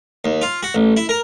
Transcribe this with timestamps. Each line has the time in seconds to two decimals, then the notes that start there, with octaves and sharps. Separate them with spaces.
0.25 D#2
0.42 F4
0.63 F#4
0.75 A1
0.97 E4
1.09 A#4